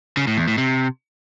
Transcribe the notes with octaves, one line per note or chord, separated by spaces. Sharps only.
C#3
A2
E2
A2
C3